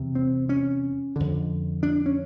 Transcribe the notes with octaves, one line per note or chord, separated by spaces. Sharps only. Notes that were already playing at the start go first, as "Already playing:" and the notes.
Already playing: E2 C3
C4
C#4
F2 D3
D4
C#4